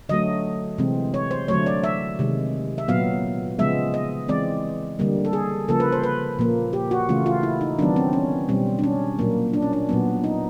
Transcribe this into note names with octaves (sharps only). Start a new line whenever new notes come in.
D3 F#3 A3 D#5
C3 E3 G#3 C4
C#5
C5
D3 F#3 A3 C#5
D5
E5
C3 D#3 G#3
E5
A#2 F#3 B3 F5
C#3 F3 G#3 B3 E5
D#5
E3 G#3 C4 D5
D3 G3 A#3
A4
G#4
C#3 F3 A#3 A4
B4
C5
B4
A#2 F3 A#3
G4
F#4
C#3 E3 A3 F4
F4
E4
D#4
D#3 F#3 B3 D4
C4
C#4
B2 G3 C4
D4
C#4
A#2 F#3 A#3
D4
C#4
D4
A#2 F#3 B3
D#4